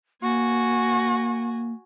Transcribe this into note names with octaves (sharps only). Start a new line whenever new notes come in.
A#3 F#4 G#5